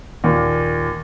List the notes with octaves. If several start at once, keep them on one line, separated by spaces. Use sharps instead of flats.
D#2 A#2